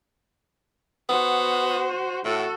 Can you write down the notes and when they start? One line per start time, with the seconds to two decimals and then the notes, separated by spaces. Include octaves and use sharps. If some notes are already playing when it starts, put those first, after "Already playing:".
1.09 B3 F#4 C5
2.25 A2 F#4 A4